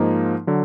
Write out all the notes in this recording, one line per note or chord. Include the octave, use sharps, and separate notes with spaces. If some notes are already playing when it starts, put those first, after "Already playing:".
Already playing: G#2 F3 A#3 D#4
D3 F#3